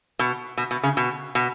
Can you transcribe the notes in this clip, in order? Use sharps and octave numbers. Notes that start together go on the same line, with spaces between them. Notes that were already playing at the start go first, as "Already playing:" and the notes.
B2
B2
B2
C#3
B2
B2